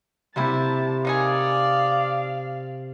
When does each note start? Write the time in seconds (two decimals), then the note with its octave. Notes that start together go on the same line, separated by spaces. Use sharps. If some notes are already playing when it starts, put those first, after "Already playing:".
0.36 C3 G3 A#3 C4 E4 A5
1.05 A#3 D#4 G#4 D5 F5